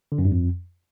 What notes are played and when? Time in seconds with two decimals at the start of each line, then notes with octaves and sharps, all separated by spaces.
0.12 D3
0.18 F#2
0.25 G2
0.31 F2